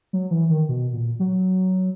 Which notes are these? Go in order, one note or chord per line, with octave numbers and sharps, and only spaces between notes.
F#3
E3
D#3
B2
A#2
F#3